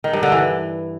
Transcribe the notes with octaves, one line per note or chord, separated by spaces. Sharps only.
D#3
G2
D3
E3